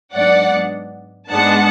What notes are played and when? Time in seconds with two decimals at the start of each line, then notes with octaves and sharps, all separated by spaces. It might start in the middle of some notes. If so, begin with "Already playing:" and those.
0.14 G#2 F#3 B3 D4 D5 F#5
1.31 G#2 G#3 B3 D4 F#5 A5